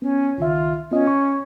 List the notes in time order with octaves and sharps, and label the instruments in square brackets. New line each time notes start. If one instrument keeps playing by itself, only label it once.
[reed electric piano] B3 [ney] C#4
[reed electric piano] C#2 D#3 E5 [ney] F4
[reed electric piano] B3 F4 D#5 [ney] C#4
[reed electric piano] C#6